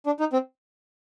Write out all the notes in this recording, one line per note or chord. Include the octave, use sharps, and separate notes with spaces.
D4
D#4
C4